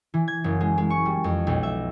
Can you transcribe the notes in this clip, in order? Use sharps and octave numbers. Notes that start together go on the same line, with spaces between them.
E3
G#6
F#1
G#3
G#3
C#6
G3
F2
B1
E5